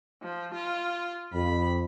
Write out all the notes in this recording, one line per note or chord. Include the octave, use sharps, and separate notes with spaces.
F3
F4
F2 B5